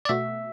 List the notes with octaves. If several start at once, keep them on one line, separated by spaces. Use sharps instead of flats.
D5
B2 A3 F#4 E5